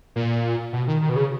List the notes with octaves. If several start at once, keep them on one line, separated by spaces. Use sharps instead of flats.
A#2
B2
D#3
D#3
B2
C#3